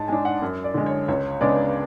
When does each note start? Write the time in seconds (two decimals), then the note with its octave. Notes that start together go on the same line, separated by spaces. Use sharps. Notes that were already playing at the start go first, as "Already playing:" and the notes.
Already playing: G#2 A5
0.08 G#3 D4 G#5
0.25 F#5
0.42 F#2
0.64 D5
0.74 D3 G#3
0.86 C#5
1.08 C#2 C#5
1.41 C#3 G#3 B3 D4 D5